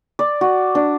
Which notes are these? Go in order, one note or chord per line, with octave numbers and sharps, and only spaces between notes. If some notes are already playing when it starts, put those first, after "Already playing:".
D5
F#4
D4